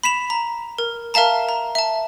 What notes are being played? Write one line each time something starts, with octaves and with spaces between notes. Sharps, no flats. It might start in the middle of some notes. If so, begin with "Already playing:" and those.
B5 B6 E7 F7
A#5
A#4
A#4 E5 F5 A5 A#5
A#5
E5 A5